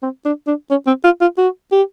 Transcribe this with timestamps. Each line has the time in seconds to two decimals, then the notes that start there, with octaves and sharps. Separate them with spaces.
0.03 C4
0.25 D4
0.47 D4
0.71 C#4
0.87 C4
1.04 F4
1.21 F4
1.38 F#4
1.72 G4